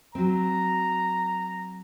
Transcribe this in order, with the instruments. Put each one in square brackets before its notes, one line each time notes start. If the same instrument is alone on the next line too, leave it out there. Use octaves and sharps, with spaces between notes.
[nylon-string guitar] F#3 C4 [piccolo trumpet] A#5